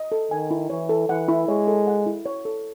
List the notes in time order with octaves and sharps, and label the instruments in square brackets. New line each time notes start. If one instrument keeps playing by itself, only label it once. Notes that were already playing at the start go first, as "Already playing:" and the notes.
Already playing: [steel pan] D#5
A4
[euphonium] D#3 [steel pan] G#5
[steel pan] E4
[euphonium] E3 [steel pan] C#5
[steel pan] A4
[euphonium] E3 [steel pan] F#5
[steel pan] E4
[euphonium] G#3 [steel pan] C#5
[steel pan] A4
F#5
E4
C#5
A4